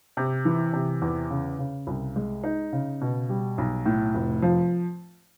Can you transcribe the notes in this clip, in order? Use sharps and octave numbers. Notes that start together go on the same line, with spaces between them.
C3
E3
C3
E2
C#3
C#3
C2
G#3
D#4
C#3
B2
G3
B1
A2
F1
F3